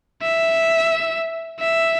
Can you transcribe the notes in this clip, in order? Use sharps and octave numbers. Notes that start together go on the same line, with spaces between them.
E5
E5